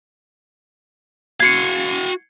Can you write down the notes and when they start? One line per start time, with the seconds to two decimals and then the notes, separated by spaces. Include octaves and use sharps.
1.40 F#4 F5 G#6 C7 C#7